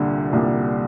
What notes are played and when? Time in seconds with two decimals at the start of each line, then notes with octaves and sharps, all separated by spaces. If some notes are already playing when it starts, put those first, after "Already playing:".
Already playing: C2 A#2 D3 G3
0.33 C2 A#2 G3